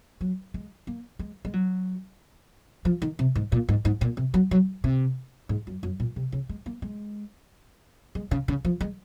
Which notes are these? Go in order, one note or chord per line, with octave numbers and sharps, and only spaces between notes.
F#3
G#3
A#3
G#3
G#3
F#3
F3
D#3
C3
G#2
A#2
G#2
G#2
A#2
C3
F#3
F#3
C3
G#2
F#2
F#2
A#2
C3
C#3
G#3
A#3
G#3
G#3
C#3
C#3
F3
G#3